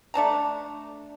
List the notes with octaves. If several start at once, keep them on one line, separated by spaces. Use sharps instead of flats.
A3 D4 A5 A#5